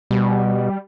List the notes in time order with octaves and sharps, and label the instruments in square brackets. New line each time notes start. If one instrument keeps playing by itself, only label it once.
[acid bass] B2 [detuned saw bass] G3